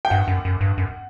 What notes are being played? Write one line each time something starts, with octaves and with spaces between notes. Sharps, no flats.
G5
G2 F#5
F#2
F#2
G2
F#2